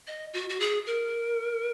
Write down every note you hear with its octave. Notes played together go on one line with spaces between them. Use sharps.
D#5
F#4
F#4
G#4
A#4